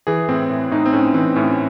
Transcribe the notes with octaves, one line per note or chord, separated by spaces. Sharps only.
E3 G#4
A2 C4
A2
A2 D#4
C4
A2 C#4
E3 C4
A2 C#4